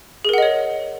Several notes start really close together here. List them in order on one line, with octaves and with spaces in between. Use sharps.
G#4 A#4 F#5 D#5 C#5